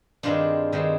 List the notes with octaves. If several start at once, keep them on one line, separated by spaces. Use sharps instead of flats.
G2 D#3 G#3 C4 D4 F4
G2 D#3 G#3 C4